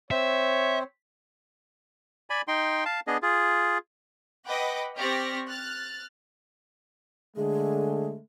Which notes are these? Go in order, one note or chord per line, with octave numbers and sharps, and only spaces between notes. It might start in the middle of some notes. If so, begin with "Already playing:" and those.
C4 C5 C#5 E5
D5 G#5 B5
D#4 G5 C6
F5 A5
B3 D4 G#4 D#5
F4 G#4
B4 D#5 F#5 G5 B5 D6
C4 G4 D5 C#6 F6 A#6
F6 F#6 A6
D3 G#3 A3 G#4